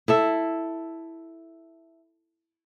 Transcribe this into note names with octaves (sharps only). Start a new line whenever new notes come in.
E4 A4 E5